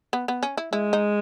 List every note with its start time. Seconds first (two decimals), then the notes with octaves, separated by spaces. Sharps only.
0.13 B3
0.28 B3
0.43 C#4
0.57 E4
0.73 G#3 E4
0.93 D#4